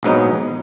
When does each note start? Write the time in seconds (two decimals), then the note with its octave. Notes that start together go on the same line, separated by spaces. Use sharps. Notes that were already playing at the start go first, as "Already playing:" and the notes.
0.03 A#1 G#2 F#3 B3 D#4